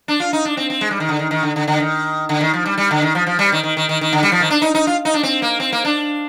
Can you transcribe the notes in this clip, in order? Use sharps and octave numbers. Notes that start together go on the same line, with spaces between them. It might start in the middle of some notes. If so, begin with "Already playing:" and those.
D4
F4
D#4
D4
C4
C4
G#3
G3
D#3
D3
D#3
D#3
D3
D3
D3
D#3
D3
D#3
F3
G3
G3
D3
D#3
F3
F3
G3
D#3
D#3
D#3
D#3
D#3
D3
G3
F3
D#3
D4
D#4
D#4
F4
D#4
D4
C4
A#3
C4
A#3
D4